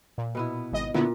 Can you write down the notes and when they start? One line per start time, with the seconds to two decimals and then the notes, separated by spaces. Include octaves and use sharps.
0.18 A#2
0.35 B2 B3 E4
0.72 G#1 D#5
0.94 A#2 D3 B3 E4